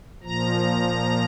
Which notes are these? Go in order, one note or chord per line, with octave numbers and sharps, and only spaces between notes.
A#2 F3 A#5